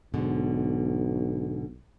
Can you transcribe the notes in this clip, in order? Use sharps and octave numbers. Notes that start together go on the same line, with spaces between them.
B1 G#2 B2 D3